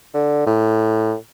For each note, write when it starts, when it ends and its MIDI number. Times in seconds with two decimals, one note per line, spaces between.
0.14 0.43 50
0.46 1.14 45